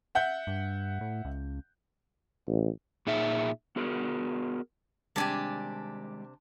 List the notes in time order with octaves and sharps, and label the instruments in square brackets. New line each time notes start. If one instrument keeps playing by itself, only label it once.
[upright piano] E5 F#5 G6
[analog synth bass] G2
A2
C#2
[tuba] A1
[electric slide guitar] A#2 D#4 G#4 E5
B3 F#4 G#4 A#4
[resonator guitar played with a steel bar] C3 D4 [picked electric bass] D#3 G3 G#3 [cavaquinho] G4 G#5 A5